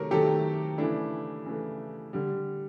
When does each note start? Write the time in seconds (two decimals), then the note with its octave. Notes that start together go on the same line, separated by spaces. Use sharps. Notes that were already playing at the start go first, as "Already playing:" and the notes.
Already playing: C3 D#3 F#3 A3 A#4 C#5
0.11 C3 D#3 F#3 A3 G4 A4
0.78 C#3 E3 A3 D4 E4
1.46 C#3 E3 A3
2.13 D3 G3